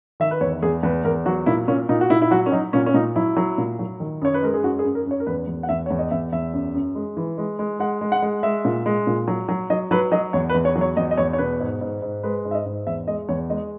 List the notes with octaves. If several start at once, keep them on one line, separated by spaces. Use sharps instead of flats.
D#3 E5
B4
E2 C#5
E2 G#4
E2 B4
E2 A#4
F#3 F#4
A#2 E4
A#2 C#4
A#2 D#4
F#4
A#2 E4
E4
F#3 F#4
C#4
F#3 D#4
A#2 C#4
C#4
A#2 D#4
F#3 E4
F#3
A#2
F#3
D#3
F#2 C#5
B4
G#3 A#4
G#4
F#2 F#4
G#4
F#2
A#4
F#2
C#5
A#4
E2 B4
E2
F#5
E2 E5
E2 C#5
D#5
E2 E5
E2 E5
F#2
F#2
G#3
E3
G#3
G#3
G#3 F#5
G#3
F#5
G#3
G#3 E5
A#2
G#3
A#2
F#3
F#3
F#3 D#5
F#3 B4
F#3 D#5
E2 C#5
B4
E2
C#5
F#3
C#5
E2 D#5
D#5
E2 C#5
C#5
B2 B4
G#2
G#2
G#2
G#3 B4
G#2
E5
D#5
G#2
E2 E5
G#3 D#5
E2 C#5
G#3 D#5